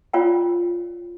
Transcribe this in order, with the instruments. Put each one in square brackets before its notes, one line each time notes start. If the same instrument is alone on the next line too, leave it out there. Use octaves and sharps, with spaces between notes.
[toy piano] F4 C#5 D5 F5 G5